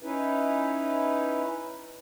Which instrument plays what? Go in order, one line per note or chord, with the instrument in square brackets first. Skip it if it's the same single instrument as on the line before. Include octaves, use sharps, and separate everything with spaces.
[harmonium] C#4 D#4 E4 B4